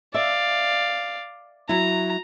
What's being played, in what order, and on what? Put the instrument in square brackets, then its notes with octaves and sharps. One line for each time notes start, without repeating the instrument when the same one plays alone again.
[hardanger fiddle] D5 F5 [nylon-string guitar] E5
[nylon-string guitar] F#3 E4 [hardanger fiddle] A#5